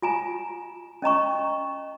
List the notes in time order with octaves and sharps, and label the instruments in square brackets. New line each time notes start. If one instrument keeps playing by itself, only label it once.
[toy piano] F4 G#5 A#5
C#4 D#5 A#5 C#6